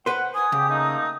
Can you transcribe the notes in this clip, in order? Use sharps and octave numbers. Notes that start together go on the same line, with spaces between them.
B4 C5 F#5
G#5 D#6
C#3 G4
A3 A#3 D#4